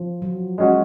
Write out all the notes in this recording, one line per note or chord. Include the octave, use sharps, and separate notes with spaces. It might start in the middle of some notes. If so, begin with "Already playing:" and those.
Already playing: F3
F#3
G#3 C#4 F#4